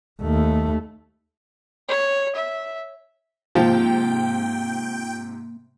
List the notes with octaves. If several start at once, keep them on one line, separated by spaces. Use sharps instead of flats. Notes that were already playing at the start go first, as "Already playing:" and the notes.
D#2 A3
C#5
E5
G#2 C3 F3 A#3 C5 G5